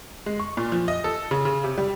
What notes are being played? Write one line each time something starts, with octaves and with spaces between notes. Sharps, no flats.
G#3
C#6
A#2
F3
D#5
A4
C#3
C#3
C3
G3